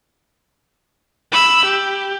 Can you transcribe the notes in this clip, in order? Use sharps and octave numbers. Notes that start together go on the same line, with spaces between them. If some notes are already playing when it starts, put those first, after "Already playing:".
B5 E6
G4